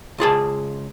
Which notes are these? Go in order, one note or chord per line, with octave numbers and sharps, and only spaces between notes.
C#2 F4 G#4 A5